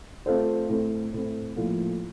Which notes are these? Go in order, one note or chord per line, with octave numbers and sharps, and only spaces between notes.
A3 C4 F4 A4 C5
A2 A3 C4
A2 A3 C4
A2 F3 A#3 F4 A4